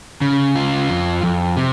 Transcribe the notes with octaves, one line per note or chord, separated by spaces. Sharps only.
C#3
F4
F2
F2
C3